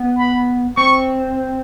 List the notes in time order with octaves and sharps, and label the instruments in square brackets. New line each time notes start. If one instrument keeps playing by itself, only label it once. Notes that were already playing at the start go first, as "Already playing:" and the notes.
Already playing: [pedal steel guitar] B3
[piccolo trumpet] B5
[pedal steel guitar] C4 [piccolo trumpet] C#6